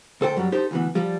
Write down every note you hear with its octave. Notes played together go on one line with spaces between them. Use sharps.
D2 A4 C5 G5
F#2 F#3 G3
D#4 G4 A4 C5
D2 E3 B3
F3 G3